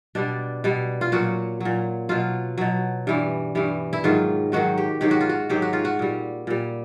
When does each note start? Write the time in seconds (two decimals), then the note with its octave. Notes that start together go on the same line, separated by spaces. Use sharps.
0.15 B2 G3 D4
0.64 B2 G3
1.01 F4
1.12 A#2 F#3 F#4
1.61 A#2 F#3
2.09 B2 F#3 F4
2.58 B2 F#3
3.07 G2 E3 G3
3.55 G2 E3 G3
3.93 E4
4.04 G#2 D#3 F#3 F4
4.52 G#2 D#3 F#3 F#4
4.78 G4
5.01 G#2 D#3 F#3 G4
5.11 F#4
5.21 F4
5.29 F#4
5.50 G#2 D#3 F#3 G4
5.62 F#4
5.73 F4
5.85 F#4
5.99 A#2 G3
6.47 A#2 G3